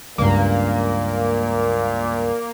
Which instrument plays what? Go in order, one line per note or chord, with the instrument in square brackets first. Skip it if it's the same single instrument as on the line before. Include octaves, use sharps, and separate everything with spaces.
[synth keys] C#2 G2 [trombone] A#2 [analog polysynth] A#3